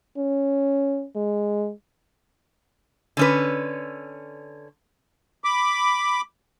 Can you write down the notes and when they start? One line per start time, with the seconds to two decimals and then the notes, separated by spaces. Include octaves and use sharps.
0.17 C#4
1.16 G#3
3.17 D3 C#4 B4
5.44 B5 D6